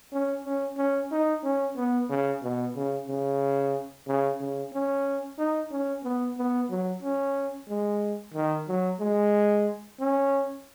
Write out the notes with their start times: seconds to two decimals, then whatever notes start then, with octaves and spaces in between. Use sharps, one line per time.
0.13 C#4
0.45 C#4
0.78 C#4
1.12 D#4
1.44 C#4
1.76 B3
2.09 C#3
2.43 B2
2.76 C#3
3.08 C#3
4.07 C#3
4.40 C#3
4.73 C#4
5.39 D#4
5.71 C#4
6.04 B3
6.38 B3
6.70 F#3
7.03 C#4
7.69 G#3
8.34 D#3
8.68 F#3
9.00 G#3
10.00 C#4